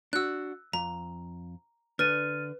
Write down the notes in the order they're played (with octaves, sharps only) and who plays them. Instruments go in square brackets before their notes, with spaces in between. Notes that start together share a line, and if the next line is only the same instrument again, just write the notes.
[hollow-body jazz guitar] D4 F#4 [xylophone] E6 F#6
[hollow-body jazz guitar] F2 [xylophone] A#5
[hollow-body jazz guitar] D3 D4 [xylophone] B4 [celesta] F6 A6 D#7